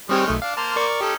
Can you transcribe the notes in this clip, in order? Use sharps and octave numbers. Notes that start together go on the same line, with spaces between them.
D#3 G3 G#3 C4 G4 C#5
B1 A3
D4 F5
A#3 C5 A5 F6
A#4 D5 C#6
C#4 D#4 G4 A4